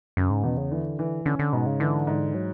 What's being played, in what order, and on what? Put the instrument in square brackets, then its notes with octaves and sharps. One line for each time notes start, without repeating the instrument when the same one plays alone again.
[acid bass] F#2 [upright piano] C#3
[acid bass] G#2
[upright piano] E2 [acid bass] B2
[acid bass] C#3
[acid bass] D3 [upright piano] E3
[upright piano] E3
[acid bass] D3 [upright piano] C#4
[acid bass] D3
[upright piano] G#2 [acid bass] B2
[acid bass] C#3
[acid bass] D3 [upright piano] E3
[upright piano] G#2
[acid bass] F#3